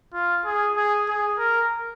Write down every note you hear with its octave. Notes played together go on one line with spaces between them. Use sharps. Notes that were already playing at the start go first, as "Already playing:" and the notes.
F4
G#4
G#4
G#4
A#4